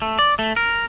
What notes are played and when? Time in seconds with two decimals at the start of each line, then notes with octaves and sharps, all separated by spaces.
0.02 A3
0.19 D5
0.39 A3
0.56 A#4